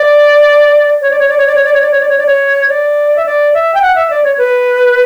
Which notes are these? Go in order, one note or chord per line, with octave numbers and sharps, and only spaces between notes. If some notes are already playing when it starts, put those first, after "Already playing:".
Already playing: D5
C#5
D5
C#5
D5
C#5
D5
C#5
D5
C#5
D5
C#5
D5
C#5
D5
C#5
D5
E5
D5
E5
G5
F#5
E5
D5
C#5
B4